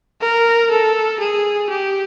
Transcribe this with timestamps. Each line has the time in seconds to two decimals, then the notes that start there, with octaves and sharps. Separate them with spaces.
0.21 A#4
0.71 A4
1.20 G#4
1.70 G4